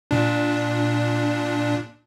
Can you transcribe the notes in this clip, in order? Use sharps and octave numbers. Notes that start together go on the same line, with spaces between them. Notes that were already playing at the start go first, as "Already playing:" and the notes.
A#2 D4